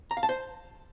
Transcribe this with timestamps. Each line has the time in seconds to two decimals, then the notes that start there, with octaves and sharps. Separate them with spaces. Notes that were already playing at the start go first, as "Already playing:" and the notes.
0.11 A#5
0.17 F5
0.23 A5
0.29 C5